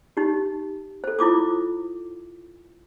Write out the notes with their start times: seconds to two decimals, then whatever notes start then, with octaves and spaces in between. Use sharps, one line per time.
0.17 D#4 G4
1.04 A4 C5
1.19 E4 F4 D6 D#6